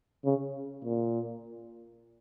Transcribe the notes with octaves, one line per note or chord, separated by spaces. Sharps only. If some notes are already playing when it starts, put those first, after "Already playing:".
C#3
A#2